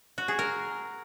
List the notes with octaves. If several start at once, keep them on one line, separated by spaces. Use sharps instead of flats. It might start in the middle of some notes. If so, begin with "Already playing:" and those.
F#4
G#4
A#4